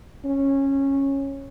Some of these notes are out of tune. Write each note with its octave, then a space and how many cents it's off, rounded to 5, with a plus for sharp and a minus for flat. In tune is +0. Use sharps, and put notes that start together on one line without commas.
C#4 -15